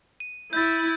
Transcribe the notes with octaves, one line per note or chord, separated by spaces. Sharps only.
D#7
E4 G6 A6